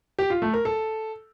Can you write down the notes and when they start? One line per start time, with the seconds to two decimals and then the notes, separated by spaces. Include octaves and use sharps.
0.19 G4
0.30 F4
0.42 A3
0.54 A#4
0.65 A4